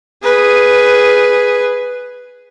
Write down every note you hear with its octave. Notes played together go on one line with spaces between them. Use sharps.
G#4 B4